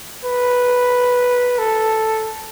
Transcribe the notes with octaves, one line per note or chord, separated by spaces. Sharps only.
B4
A4